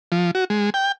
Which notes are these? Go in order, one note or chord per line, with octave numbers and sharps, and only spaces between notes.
F3
F#4
G#3
G5